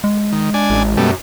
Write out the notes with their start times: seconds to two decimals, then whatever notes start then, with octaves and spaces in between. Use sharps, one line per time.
0.04 G#3
0.32 D#3
0.54 D4 G#5
0.70 A1
0.97 F#2 B2 G3 A3